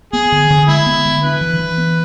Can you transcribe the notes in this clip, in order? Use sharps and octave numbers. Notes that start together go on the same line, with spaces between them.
B3 G#4
D3
D3
G#3 E4
B3
D3
D4 B4
E3
E3
B3